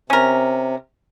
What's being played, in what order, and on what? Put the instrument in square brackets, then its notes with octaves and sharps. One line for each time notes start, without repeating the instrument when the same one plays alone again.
[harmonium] C3 [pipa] C#4 A#4